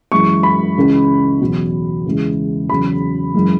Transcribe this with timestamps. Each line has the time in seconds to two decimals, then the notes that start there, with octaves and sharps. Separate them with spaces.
0.12 F#2 E3 G#3 C#6
0.43 B5
0.76 C#2 C#3 E3
1.41 E2 B2 F#3
2.06 E2 C#3 E3 G#3
2.69 E2 C#3 F#3 B5
3.34 F#2 E3 G#3